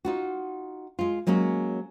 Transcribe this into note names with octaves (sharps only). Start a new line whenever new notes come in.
D#4 F4 F#4
G#3 F4
F#3 G#3 A#3 C#4